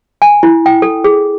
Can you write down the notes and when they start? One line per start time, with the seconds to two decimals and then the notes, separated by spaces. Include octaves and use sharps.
0.22 G#5
0.43 E4
0.66 G5
0.82 A4
1.04 G#4